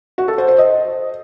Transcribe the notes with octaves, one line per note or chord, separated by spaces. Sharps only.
F#4
A4
C5
C5
D#5